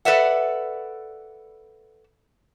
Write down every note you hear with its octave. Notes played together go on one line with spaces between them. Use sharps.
A4 B4 D5 E5 F#5